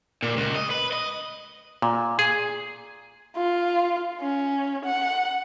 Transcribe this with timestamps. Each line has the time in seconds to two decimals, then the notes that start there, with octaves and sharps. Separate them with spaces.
0.22 A#2
0.37 C#2
0.55 D#5
0.70 B4
0.92 D#5
1.82 A#2
2.19 G#4
3.36 F4
4.21 C#4
4.85 F#5